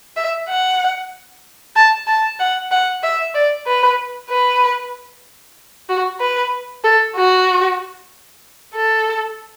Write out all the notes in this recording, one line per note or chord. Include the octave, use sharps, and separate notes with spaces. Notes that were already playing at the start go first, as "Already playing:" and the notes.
E5
F#5
A5
A5
F#5
F#5
E5
D5
B4
B4
F#4
B4
A4
F#4
A4